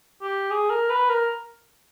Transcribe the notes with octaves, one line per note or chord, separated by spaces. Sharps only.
G4
G#4
A#4
B4
A#4